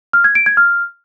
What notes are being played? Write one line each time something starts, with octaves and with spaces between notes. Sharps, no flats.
F6
G#6
D7
G#6
F6